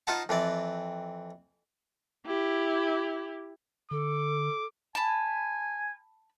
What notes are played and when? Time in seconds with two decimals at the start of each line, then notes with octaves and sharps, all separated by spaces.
0.07 D#4 F4 C5 D#5 F#5 A5
0.29 F2 E3 C4 D5
2.26 E4 G4
3.91 D3 A4 D6
4.95 G#5 A5 B5